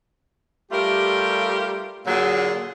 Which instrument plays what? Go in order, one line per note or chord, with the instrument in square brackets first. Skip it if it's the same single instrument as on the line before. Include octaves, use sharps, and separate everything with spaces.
[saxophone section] G3 A3 F4 G4 A#4
A#2 D3 F#3 G#4